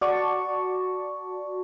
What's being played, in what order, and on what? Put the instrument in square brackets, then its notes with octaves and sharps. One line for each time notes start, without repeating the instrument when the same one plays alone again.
[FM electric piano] F#4 D5 A5 C#6